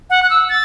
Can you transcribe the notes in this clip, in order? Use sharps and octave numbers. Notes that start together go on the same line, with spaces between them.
F#5
F#6
E6
A6